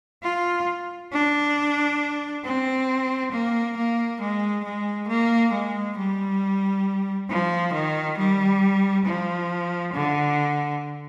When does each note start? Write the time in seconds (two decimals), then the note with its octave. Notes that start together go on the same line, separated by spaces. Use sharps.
0.23 F4
1.12 D4
2.44 C4
3.31 A#3
3.77 A#3
4.21 G#3
4.64 G#3
5.08 A#3
5.53 G#3
5.97 G3
7.30 F3
7.73 D#3
8.18 G3
9.05 F3
9.93 D3